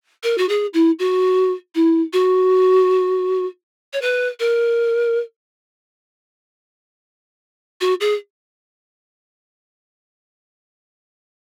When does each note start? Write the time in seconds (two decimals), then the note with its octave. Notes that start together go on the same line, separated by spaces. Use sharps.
0.23 A#4
0.38 F#4
0.49 G#4
0.74 E4
0.99 F#4
1.75 E4
2.13 F#4
3.93 C#5
4.02 B4
4.40 A#4
7.81 F#4
8.01 G#4